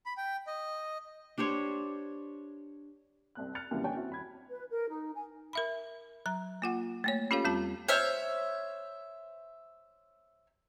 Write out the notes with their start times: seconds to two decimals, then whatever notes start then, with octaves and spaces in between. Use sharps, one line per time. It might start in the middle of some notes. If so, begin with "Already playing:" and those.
0.06 B5
0.17 G5
0.47 D#5
1.38 D4 G4 C5 C#5
3.35 C2 C4 F#6
3.55 F6 F#6 A6 C#7 F7
3.71 D#2 C3 E3 F#3 G3 C#4
3.84 C#4 D4 C#5 G5 G#5
3.96 C4 E4 F#4
4.10 D#1 B5 G#6
4.51 B4
4.71 A#4
4.89 D#4
5.15 G#5
5.53 A#4 E5 B5
6.26 F#3 A#5
6.62 A#3 F4 F#5
7.04 A3 A#3 C#5
7.31 C#4 F4 G4 A4 C#5 F5
7.44 E2 G3 C4 F4 A5
7.88 C5 C#5 E5 F6